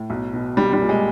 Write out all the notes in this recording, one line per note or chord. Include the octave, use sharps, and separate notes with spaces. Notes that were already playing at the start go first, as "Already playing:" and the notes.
Already playing: A2
B1
B2
C2 G3
G3
A#2
G#3